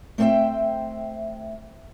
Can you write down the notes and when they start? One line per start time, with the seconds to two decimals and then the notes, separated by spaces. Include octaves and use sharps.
0.18 A3 C4 C5 C#5 E5 G5